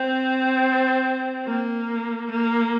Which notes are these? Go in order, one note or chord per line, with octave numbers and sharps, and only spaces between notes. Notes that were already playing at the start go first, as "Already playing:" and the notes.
Already playing: C4
A#3
A#3